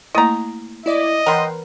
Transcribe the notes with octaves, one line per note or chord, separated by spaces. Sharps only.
A3 A#3 E4 D#5 A#5
E4 D5 D#5
E3 B3 A#4 F#5 G5 C6